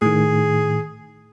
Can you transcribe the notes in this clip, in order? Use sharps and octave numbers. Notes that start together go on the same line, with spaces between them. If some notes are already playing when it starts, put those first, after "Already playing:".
A2 D#3 G#4